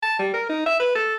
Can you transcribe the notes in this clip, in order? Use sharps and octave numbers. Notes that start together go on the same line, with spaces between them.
A5
G3
A#4
D#4
E5
B4
A4